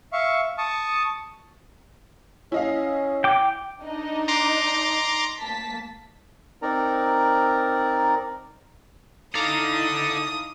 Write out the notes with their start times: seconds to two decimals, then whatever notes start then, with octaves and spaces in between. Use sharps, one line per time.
0.13 E5 F5 C#6
0.58 A5 C#6 D#6
2.52 C#4 E4 D#5 F5
3.24 G5 D6
3.83 D4 D#4 D#5
4.28 A#5 C6 D6
5.40 A#3 A5 B6
6.62 C4 D#4 A#4 D5 A#5
9.35 D#4 E4 A4 D5 F5 A#5 D6 D#6